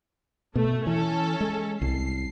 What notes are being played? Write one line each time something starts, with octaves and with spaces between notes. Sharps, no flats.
B2 A3
E3 C#4 A4
G#3
C2 C7